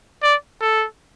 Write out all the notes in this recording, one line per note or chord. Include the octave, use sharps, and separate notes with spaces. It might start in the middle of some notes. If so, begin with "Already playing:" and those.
D5
A4